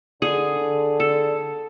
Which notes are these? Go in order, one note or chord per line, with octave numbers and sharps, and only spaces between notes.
D3 G#4
A4